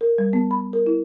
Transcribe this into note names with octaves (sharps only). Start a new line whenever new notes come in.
A#4
G3
B3
B5
A#4
E4